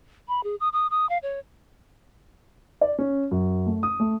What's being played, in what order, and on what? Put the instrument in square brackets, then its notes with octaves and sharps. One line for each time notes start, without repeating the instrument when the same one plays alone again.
[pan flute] B5
G#4
D#6
D#6
D#6
F5
C#5
[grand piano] D5
C#4
F#2
A3
D#6
A3